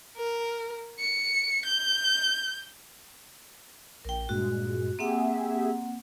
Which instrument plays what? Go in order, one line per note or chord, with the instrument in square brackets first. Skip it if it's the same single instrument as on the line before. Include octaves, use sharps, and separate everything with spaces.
[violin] A#4
C#7
G6
[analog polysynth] A#1 [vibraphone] A#4 G5
[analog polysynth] G2 A#2 G#3 [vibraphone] F#4
[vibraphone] A#3 C4 F#5 [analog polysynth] G4 G#4 E5